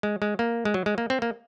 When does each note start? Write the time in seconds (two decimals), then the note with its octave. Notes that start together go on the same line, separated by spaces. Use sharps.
0.03 G#3
0.22 G#3
0.39 A#3
0.65 G#3
0.74 F#3
0.86 G#3
0.98 A#3
1.10 C4
1.22 A#3